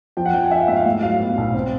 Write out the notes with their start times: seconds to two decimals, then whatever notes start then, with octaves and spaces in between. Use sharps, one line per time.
0.17 F3 G5
0.26 F#5
0.33 F3 G5
0.42 G#5
0.51 D4 E5
0.60 F5
0.68 G#2 E5
0.77 F5
0.85 A2
1.02 F#3 F5
1.20 B3
1.38 B1
1.54 C4